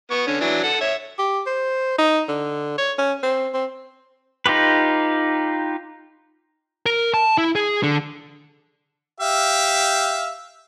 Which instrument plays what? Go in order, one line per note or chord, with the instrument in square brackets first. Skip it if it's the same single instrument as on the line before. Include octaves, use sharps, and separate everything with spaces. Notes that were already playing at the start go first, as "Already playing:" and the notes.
[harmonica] B3 C#6
D3 C#4
E3 F#3 D4
A4 F#5
C#5 E5
[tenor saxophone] G4
C5
D#4
D3
C#5
C#4
C4
C4
[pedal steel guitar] D#4 F4 G4 B4
[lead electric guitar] A#4
A5
E4
G#4
D3
[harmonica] G4 E5 F5